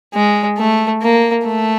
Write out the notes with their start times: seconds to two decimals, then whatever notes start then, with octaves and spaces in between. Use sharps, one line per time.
0.14 G#3
0.58 A3
1.02 A#3
1.45 A3